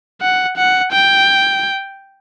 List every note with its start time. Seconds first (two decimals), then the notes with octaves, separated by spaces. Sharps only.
0.21 F#5
0.57 F#5
0.92 G5